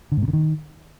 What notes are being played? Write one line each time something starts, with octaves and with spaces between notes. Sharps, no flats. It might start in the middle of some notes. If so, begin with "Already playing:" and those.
D3
G#2
B2
D3
D#3